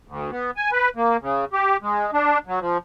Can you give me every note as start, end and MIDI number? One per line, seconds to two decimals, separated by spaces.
0.08 0.31 38
0.31 0.51 59
0.57 0.71 80
0.72 0.89 71
0.96 1.17 58
1.22 1.45 49
1.53 1.77 67
1.82 2.11 56
2.13 2.38 62
2.47 2.59 54
2.60 2.78 53